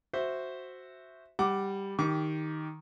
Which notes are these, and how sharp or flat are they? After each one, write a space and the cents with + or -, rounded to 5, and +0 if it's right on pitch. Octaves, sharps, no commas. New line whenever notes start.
F#4 +0 C5 +0 E5 +0
G3 +5 F#5 +25 D6 +0
D#3 +5 G4 +0 D6 -45